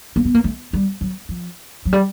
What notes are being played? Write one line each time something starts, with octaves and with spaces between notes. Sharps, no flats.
A#3
B3
A#3
A3
G3
F#3
F3
F#3
G3